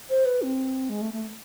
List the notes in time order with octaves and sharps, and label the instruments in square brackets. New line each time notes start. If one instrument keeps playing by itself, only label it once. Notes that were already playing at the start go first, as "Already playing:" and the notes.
[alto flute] C5
B4
C4
G#3
A3
A3